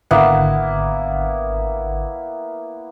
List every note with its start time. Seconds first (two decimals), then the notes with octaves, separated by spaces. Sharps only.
0.11 G#1 D3 A#3 B3 E4 F#5